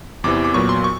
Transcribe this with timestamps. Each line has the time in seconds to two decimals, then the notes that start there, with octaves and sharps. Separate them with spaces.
0.24 E2 C3 E3 D6
0.45 D6
0.54 A#2 F#3 B3 C#6
0.69 C6
0.84 C#6